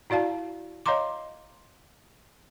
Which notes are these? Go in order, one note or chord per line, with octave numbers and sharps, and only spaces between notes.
E4 F#4 D5 F5 A5
C#5 D#5 F5 A#5 C6 D6